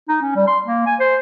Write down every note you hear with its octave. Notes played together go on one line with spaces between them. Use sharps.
D#4
C#4
G3
C6
A#3
G#5
C5